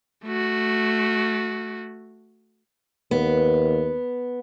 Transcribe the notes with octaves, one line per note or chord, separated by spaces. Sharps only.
A3 F#4
D#2 B3